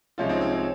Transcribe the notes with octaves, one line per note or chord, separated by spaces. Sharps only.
C2 C3 F3 G#3 C#4 F4
C4 D#4
C4
C#4